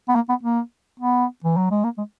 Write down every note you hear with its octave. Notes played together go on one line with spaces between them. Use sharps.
B3
A#3
B3
A#3
B3
E3
F#3
G#3
A#3
G#3